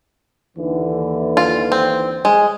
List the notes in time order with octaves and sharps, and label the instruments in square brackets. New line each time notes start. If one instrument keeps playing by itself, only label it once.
[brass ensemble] D#2 D3 E3
[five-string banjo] F4
C4
G#3